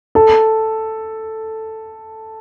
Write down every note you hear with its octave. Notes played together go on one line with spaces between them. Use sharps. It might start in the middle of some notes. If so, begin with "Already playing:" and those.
A4